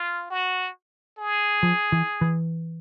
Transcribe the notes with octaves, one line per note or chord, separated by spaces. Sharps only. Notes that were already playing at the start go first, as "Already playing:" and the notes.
Already playing: F4
F#4
G#4
F3
E3
E3